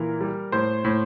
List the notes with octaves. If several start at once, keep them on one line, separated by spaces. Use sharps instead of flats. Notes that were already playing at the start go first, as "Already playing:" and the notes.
Already playing: A#2 E3 A#4
G3
A2 C5
A2